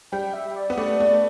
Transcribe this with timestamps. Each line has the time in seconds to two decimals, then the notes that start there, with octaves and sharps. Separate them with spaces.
0.12 G3 G5
0.34 E5
0.56 D5
0.70 B3
0.78 A3 D5
1.00 A3